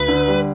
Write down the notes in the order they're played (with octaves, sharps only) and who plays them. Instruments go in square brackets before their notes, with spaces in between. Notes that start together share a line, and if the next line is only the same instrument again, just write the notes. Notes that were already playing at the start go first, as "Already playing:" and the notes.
Already playing: [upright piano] D2 [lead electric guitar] B4
[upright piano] D3
G3